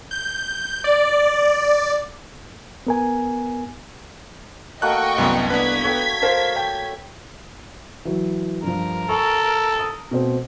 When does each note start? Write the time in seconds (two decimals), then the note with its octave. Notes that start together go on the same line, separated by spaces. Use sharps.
0.11 G6
0.84 D5
2.87 B3 A#4 G#5
4.82 A3 A#3 F#4 D#5 G5 C#6 F#6
5.18 C2 F#2 B3
5.50 B3 D4 B4 G#6 B6
5.84 A4 C#5 G5
6.22 A#4 C5 F5 A5
6.56 G5
8.05 E3 F#3
8.63 G2 F3 A#4
9.09 A4 G#5 C#6
9.79 D#6
10.11 B2 A3 C4